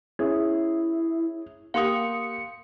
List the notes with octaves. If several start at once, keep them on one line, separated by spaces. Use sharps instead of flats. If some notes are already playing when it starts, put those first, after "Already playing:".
C#4 E4 G#4
A#3 G4 F5 F#5 C6 D#6 C#7